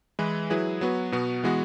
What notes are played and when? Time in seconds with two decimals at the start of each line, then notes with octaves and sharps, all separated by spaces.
0.19 E3 G#3 E4 B4
0.50 F#3 E4 G#4 B4
0.81 F#3 B3 F#4 B4
1.12 B2 B3 F#4
1.44 E3 G#3 B3 F#4